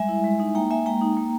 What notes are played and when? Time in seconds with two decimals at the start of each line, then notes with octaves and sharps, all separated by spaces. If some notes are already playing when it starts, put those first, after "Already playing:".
Already playing: G3 G#3 E5 G#5
0.09 E4
0.24 G#3
0.40 D#4
0.55 A#3 G5 A#5
0.70 A#3 E5 G#5
0.86 G#3 G5 A#5
1.01 D#4
1.17 A#3